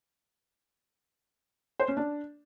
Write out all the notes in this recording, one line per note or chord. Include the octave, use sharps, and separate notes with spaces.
C5
C#4
D4